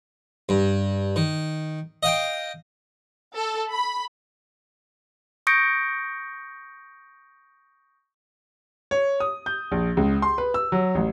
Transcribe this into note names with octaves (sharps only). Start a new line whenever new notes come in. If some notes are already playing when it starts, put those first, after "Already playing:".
G2
D#3
D#5 F5 G5
A4
B5
C#6 D#6 G6 A#6 C#7 D7
C#5
D#6
G6
A#1
C#2
C6
B4
E6
F#3
A1